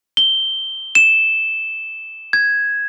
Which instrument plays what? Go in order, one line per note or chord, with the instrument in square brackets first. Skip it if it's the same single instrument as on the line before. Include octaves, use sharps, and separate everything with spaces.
[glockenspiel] G7
E7
G#6